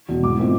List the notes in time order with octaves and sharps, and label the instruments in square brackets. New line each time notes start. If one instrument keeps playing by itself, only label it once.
[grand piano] E2 B2
G#2 D6
F3 A3 C4 D#4